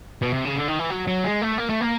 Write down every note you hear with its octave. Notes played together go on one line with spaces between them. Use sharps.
B2
C3
C#3
D3
D#3
E3
F#3
F#3
G#3
A3
A#3
A3
A#3